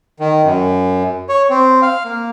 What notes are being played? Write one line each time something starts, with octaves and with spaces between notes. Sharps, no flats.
D#3
F#2
C#5
C4
F5
A#3